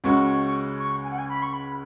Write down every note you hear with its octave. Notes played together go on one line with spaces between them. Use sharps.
C#2 C#3 G#3 C#4 F#4 C#6
C#6
G#5
F#5
G#5
B5
C#6
B5